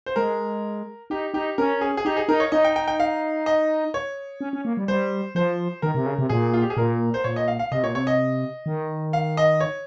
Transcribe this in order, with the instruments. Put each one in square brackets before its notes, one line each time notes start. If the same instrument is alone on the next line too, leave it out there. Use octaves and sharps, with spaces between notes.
[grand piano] C5
[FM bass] G#3 [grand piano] A#4
[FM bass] D#4 [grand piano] G4
[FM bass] D#4 [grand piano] G4
[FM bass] C#4 [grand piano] A#4
[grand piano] G#4
G#4
[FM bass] D#4 [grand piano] G4
[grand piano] G#4
[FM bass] D#4 [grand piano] A#4
[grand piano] C#5
[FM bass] D#4 [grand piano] D#5
[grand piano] G5
G5
G5
F5
D#5
C#5
[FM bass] C#4
C#4
A#3
G3
[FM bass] G3 [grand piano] C5
[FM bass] F3 [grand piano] C5
[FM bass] D#3 [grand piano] A#4
[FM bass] C3
C#3
C3
[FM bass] A#2 [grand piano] G#4
[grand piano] F4
G4
G#4
[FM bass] A#2 [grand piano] A#4
[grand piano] C5
[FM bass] A#2 [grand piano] C#5
[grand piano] D#5
F5
F5
[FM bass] C3 [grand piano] D#5
[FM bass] A#2 [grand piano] C#5
[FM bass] C3 [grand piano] C#5
[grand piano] D#5
[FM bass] D#3
[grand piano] F5
D#5
C#5